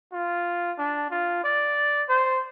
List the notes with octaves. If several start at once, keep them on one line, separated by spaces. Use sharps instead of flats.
F4
D4
F4
D5
C5